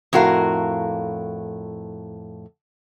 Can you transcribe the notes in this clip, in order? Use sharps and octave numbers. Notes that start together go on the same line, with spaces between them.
F2 A2 F#4 A#4 F5